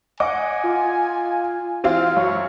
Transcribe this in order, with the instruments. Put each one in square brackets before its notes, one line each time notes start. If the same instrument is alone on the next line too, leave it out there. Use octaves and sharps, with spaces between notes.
[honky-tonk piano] D#5 F#5 D6 [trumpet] G#5
[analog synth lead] F4
[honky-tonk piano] E3 C4 F4 [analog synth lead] F5
[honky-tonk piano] F#2 [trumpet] C#5